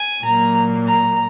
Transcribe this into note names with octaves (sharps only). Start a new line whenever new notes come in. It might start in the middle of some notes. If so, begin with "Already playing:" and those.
Already playing: G#5
A#2 F#3 A#3 A#5
A#5